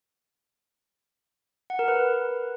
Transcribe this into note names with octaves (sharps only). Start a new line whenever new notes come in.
F#5
A#4
B4